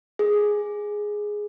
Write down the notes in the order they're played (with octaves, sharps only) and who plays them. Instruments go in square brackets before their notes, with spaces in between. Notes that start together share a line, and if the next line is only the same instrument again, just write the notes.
[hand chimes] G#4